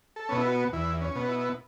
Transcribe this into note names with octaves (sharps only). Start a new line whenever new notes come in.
A4
B2 B3 C#4
E4
F#4
E2 E4
C#4
B2 B3
E4